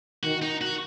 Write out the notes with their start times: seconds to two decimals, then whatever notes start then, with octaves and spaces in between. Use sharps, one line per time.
0.24 D#3 F#4
0.42 D#4
0.61 F#4